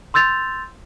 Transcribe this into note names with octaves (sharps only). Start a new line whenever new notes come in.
C6 E6 G6 A6 F7